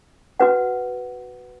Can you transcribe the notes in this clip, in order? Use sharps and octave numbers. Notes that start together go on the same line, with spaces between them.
F#4 B4 F#5